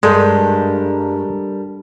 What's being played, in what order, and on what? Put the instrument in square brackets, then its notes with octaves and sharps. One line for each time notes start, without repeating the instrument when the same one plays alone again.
[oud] G2 [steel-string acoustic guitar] G3 A4 A#4 [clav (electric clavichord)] G#3